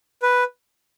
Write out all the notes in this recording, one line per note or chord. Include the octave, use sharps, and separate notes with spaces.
B4